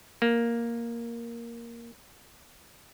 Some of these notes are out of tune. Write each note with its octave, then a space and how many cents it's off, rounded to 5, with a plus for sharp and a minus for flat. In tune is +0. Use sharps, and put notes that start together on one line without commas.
A#3 +5